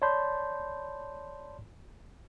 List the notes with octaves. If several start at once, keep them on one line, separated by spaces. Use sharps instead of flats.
C#5 D5 A5 B5 C6 G6